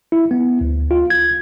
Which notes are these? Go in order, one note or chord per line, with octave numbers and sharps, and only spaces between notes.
E4
B3
D2
F4
G#6